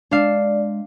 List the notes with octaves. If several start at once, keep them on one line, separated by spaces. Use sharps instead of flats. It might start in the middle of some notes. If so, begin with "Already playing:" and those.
G#3 D4 D5 F5